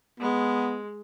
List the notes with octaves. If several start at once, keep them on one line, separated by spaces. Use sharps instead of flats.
G#3 B3